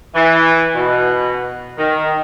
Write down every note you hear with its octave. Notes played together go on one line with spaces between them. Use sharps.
E3
B2
D#3